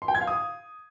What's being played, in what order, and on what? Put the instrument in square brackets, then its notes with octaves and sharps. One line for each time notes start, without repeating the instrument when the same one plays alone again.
[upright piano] C6
G5
G#6
F5
D#6